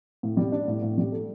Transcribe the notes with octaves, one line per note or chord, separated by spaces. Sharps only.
A2
G3
D4
A2
A2
G3
A4